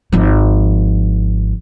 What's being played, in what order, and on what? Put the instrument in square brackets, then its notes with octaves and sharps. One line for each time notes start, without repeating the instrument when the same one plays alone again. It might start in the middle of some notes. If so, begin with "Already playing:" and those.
[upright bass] G#1 F3